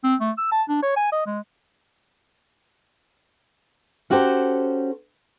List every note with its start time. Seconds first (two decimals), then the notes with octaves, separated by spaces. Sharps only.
0.04 C4
0.21 A3
0.38 E6
0.52 A5
0.69 D4
0.83 C#5
0.97 G#5
1.12 D#5
1.27 G#3
4.10 C#4 F#4 G4 A4 C5